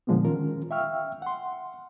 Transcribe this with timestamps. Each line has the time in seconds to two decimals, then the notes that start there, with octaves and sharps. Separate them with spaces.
0.07 A#2 D3 F3 G#3 A#3 B3
0.25 D#3 C#4 F4 A#4
0.71 E5 F5 G5 C#6 E6 F6
1.22 F#5 C6